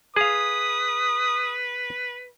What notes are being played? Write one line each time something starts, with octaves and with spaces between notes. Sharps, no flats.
G#4 B4 F5 D#6